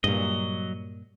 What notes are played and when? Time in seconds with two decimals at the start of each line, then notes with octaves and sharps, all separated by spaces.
0.04 G2 A#2 F#3 D#5